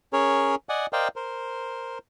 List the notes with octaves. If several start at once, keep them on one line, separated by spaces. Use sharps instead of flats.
C#4 G#4 A#4 C#5
D5 D#5 F#5 G#5
A#4 C5 D5 D#5 F5 G5
A#4 C5